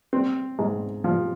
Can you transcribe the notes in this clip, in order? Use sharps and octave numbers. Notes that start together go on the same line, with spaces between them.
C4
G#2
F3